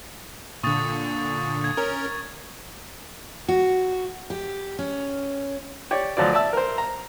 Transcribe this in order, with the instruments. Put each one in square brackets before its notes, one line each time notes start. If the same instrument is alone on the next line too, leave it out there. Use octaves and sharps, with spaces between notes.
[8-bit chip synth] A#2 D3 [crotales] C#6 D#6 A6
[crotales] G#6
[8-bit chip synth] C#4 A#4
[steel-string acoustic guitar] F#4
G4
C#4
[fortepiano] G4 C#5 D5
D2 F3 F#3 F4 D5
D5 E5 A5 E6
A#4 C5
A#5